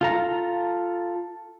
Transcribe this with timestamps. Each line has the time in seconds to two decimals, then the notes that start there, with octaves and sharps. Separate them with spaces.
0.01 F4 A4 A#5